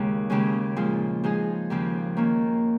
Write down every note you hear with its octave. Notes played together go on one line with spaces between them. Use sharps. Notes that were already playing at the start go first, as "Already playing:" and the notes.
Already playing: D#2 C#3 G#3 C#4
D#2 C#3 G#3 C#4
A#2 F3 G#3 F4
F3 G#3 D#4 G#4
D#2 C#3 F3
D#3 A#3 C#4